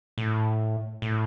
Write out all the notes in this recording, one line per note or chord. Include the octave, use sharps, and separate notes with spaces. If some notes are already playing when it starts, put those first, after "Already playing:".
A2
A2